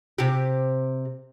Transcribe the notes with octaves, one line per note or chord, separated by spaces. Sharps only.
C3 G4